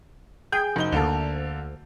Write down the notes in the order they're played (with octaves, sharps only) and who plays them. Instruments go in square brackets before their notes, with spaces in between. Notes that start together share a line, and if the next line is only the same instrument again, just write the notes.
[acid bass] G#4 [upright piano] G5 G6
[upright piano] F#1 D#4 G7
[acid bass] D2 [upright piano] D3 A#3 A4